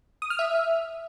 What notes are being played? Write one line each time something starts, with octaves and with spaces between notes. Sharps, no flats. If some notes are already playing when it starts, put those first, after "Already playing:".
D#6
F6
E5